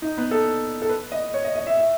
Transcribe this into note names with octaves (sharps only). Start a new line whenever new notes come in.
D#4
B3
A4
A4
B4
D#5
C#5
D#5
D#5
E5
E5